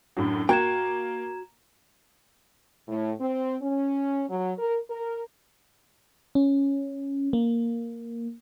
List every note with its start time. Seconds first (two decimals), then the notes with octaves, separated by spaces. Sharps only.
0.17 F#2 A2 F#3 D4
0.49 A#3 F#4 G5 A#5 G#6 E7
2.88 A2
3.20 C4
3.62 C#4
4.29 F#3
4.58 A#4
4.90 A#4
6.35 C#4
7.33 A#3